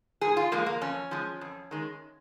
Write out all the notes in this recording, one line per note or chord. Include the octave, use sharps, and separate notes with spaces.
G#2 G#4
F4
F3 G#3 A#3
A#3
F2 C#4
F3 G#3
F2
D#3 G#3